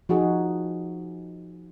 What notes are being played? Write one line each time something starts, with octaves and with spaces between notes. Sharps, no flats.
F3 D#4 F#4 G#4